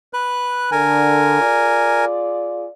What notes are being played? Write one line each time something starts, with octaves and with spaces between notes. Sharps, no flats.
B4 F#6
D3 A#4 G#5
F4 G#4 D5